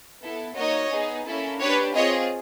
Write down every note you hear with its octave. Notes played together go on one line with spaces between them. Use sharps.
B3 E4 A4
A#3 D#4 F#4 C#5 D#5
B3 D#4 G#4
A#3 C#4 E4 A4
D4 G4 B4 C#5
C4 F4 G#4 C#5 D#5